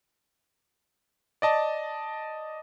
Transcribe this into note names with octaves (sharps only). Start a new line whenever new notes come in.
D5 D#5 A5